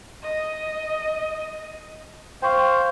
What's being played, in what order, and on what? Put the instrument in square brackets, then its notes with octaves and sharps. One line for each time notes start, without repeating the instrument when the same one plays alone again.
[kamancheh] D#5
[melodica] C5 [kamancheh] F5 [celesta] G5 C#6